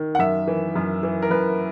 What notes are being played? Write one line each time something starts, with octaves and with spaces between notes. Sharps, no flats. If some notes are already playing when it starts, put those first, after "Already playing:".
Already playing: D#3
F#5
F#2 E5
E3
F#2
E3
A#4
F#2 B4